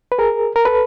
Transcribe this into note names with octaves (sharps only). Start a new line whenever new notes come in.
B4
G#4 A#4
A#4
A4 B4